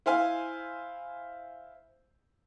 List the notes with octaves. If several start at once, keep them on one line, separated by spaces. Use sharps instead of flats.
E4 C5 F5 G#5